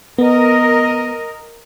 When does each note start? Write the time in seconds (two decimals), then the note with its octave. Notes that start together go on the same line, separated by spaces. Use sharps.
0.18 B3 A#4 D#5